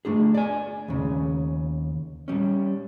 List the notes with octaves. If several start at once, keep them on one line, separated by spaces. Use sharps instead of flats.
A3 D4 G#4
D5 G#5
D#2 C#3
G3 C#4